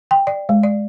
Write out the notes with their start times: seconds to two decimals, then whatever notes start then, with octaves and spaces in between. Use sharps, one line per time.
0.11 G5
0.27 D5
0.49 G#3
0.63 D5